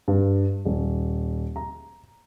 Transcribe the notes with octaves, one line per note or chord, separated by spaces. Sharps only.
G2
D#1
A#5